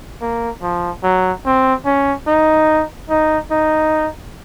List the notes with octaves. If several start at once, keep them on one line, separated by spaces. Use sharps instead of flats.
A#3
F3
F#3
C4
C#4
D#4
D#4
D#4